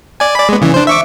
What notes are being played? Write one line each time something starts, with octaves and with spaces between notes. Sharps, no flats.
D5 G#5
D5 B5
G#3 B3
C#3 E3
D4 C5
E5 C#6 D6